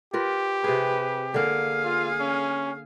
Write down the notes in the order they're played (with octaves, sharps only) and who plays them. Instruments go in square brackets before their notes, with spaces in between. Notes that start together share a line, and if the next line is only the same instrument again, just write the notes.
[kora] F4 A#4 B4 [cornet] G4
[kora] C3 G#4 [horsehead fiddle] B4
[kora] D3 A#3 [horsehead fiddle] G#4 F5
[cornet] F4
C#4